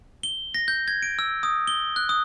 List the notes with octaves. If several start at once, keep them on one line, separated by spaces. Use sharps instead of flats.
G7
A#6
G6
G#6
D7
E6
D#6
G7
F#6
D#6